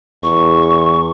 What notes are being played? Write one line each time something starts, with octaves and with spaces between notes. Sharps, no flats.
E2 C#6